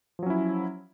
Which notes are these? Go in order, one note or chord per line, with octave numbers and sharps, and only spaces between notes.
F3 F#3 C#4 E4